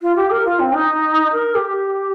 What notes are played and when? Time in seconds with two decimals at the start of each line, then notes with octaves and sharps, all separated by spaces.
0.01 F4
0.15 G4
0.30 A#4
0.45 F4
0.59 C4
0.74 D#4
1.32 A#4
1.54 G4